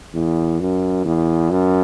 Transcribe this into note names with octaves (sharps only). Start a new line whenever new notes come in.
E2
F#2
E2
F#2